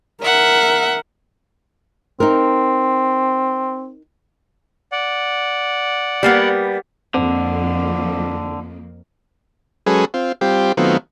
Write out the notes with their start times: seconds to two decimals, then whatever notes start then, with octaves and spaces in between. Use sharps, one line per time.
0.23 A#4 E5 F#5
2.20 C4 D#4 A#4
4.92 D5 F#5
6.23 G3 A#3 B3
7.14 F2 D3 A#3 C4
9.86 F#3 G#3 C#4 G#4 A4 B4
10.14 C4 F4
10.41 G3 C4 F4 G4
10.77 D#3 F#3 A3 B3 C4 F4